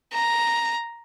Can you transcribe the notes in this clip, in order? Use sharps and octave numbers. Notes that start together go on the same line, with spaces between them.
A#5